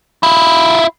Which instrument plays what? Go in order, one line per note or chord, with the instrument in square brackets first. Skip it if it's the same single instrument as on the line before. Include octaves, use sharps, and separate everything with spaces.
[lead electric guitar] E4 F4